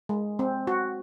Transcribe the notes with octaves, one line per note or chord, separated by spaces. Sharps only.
G#3
C4
F#4